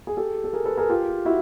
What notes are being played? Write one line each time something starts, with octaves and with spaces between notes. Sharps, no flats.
G#4
G4 A4
A4
G#4 A#4
A4 B4
G#4 A#4
F4 G4
E4 F#4